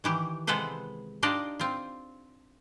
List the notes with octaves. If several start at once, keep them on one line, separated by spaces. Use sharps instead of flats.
D#3 E3 G4
C3 G#3 B3 A4 B4 C5
D4 D#4 F4 G4 D5 D#5
C4 F4